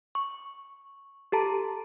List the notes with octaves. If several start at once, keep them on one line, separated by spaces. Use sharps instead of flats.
C#6
G4 A4 A5 A#5